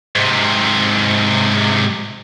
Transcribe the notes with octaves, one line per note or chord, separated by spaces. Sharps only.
G#2 C3